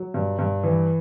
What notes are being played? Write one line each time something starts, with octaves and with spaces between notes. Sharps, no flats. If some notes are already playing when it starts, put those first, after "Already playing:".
Already playing: F#3
G2
G2
E3